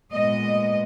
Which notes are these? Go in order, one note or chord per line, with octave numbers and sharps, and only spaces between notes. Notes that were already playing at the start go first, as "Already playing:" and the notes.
A#2 G#3 B3 D#5